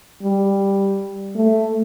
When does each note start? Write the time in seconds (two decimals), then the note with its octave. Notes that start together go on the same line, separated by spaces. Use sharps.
0.23 G3
1.35 A3